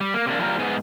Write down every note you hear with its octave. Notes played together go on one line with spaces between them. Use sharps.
G3
A#3
C3 A#3 D4
F3 G3 A#3 A4 A#4
G#2 B3 G#4